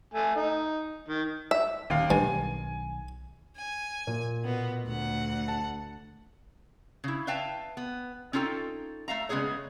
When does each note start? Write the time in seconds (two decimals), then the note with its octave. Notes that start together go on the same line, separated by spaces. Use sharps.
0.14 A3 G#5
0.36 D#4
1.08 D#3
1.51 E5
1.90 D#1 D#2 C4 C#4 F5
2.10 B1 G2 D#3 G#5
3.57 G#5
4.07 A#2
4.44 B2 B3
4.85 D2 F#5
5.48 A5
7.04 C#3 E4
7.27 B4 E5 F5 G5 A5
7.77 B3
8.33 C#4 D#4 F4 A4 G5
9.08 A3 E5 F5 A#5
9.29 C#3 G#3 B3 G#4 C#5